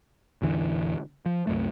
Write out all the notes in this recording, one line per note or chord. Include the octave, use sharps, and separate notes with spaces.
A1 E2 D3 E3
F3
C2 F#2 A3